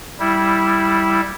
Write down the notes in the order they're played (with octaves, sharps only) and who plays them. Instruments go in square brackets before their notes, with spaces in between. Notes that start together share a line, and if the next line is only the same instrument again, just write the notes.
[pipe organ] G3 E4